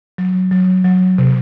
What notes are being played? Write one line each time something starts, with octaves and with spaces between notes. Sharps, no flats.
F#3
F#3
F#3
C3